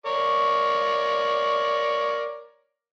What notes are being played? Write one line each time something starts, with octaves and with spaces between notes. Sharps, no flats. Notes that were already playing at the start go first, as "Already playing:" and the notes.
A#4 C#5 D5